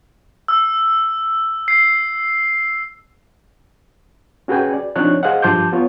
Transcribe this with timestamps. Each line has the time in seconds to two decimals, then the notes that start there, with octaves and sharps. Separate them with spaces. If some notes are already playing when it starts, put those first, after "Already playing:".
0.48 E6
1.68 C7
4.48 C#4 F#4 G#4 B4 G5 G#5
4.74 D5
4.96 F3 C4 D4 D#4 C#5 F#6
5.23 G#4 C5 D#5 F5 F#5
5.42 G2 F3 A5 C6 D6 G6
5.73 B3 F4 C#5